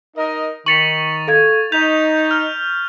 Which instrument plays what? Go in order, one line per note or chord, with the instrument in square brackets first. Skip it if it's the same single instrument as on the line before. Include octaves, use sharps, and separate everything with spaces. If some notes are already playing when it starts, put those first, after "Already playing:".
[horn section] D#4 A#4 D#5
[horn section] D#3 D#4 [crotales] C#6 A6 F7 [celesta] B6 C#7 F#7
[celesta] A4 F5 G#6
[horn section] D#4 [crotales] G6 F7 [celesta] B6
[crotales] F6